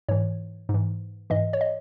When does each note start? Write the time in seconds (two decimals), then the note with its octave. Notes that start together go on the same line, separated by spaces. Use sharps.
0.09 G#2 E3 C#5
0.69 G#2
0.74 E3
1.30 G#2 E3 D#5
1.53 C#5
1.61 D#5